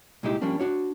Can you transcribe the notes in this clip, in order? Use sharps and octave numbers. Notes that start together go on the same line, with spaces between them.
C2 A#2 G#3 D#4 E4 G4
F3 G3 A#3 C#4 D4
D4 F#4 C#5